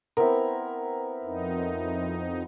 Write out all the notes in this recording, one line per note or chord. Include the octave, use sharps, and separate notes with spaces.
B3 C4 E4 A#4
F2 D#4